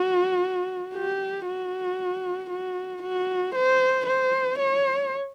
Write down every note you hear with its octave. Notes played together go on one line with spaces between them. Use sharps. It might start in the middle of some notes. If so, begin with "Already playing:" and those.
Already playing: F#4
G4
F#4
F#4
F#4
C5
C5
C#5